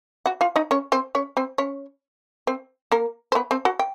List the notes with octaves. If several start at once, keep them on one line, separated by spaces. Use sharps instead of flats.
F#4 F#5
F4 F5
D#4 D#5
C#4 C#5
C4 C5
C#4 C#5
C4 C5
C#4 C#5
C4 C5
A#3 A#4
C5
B3 B4
C4 C5
F#4 F#5
G5